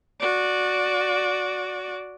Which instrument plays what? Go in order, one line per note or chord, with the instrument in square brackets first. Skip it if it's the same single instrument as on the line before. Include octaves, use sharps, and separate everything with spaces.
[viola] F#4 D5